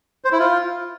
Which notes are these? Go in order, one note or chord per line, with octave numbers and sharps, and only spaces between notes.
C5
E4
F4